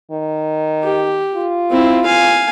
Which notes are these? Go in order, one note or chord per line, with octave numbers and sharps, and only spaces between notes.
D#3
G4
F4
C4 E4
F5 G#5